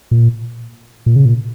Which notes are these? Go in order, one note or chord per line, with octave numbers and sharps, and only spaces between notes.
A#2
A#2
C#3
A#2